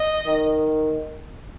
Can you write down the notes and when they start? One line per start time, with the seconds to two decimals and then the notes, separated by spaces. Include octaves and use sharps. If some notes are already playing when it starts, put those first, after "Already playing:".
Already playing: D#5
0.26 D#3